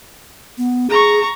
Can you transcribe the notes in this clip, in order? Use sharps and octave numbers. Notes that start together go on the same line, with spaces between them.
B3
G#4 A#5 C#6